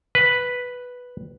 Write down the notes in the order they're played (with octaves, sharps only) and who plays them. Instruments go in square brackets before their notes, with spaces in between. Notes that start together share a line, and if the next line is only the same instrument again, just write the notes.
[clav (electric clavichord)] B4